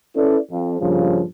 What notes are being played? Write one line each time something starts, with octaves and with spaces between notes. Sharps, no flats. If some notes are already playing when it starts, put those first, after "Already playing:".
C#4 E4 A4 B4 D5
F2
G2 A#2 C#3 F3